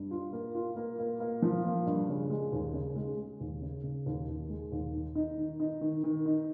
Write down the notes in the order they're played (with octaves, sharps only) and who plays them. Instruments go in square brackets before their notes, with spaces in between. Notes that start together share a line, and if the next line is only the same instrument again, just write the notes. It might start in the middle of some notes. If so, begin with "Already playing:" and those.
Already playing: [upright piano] G2
F4
A#3
F4
A#3
A#3
A#3
F3
A#3
G2
C#3
G#3
D#2
C#3
G#3
G#3
D#2
C#3
C#3
D#2
D#2
G#3
D#2
D#3
D#4
D#3
D#4
D#3
D#3
D#4